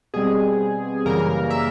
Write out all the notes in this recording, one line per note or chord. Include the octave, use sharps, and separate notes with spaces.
B2 G3 C4 G#4
F#2 C#3 E3 G3 A#3 A#4
E5